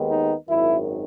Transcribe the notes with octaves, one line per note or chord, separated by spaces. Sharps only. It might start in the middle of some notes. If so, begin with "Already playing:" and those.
Already playing: D#2 D#3 G#3 B3
D#4
G#1 F#2 D#3 E4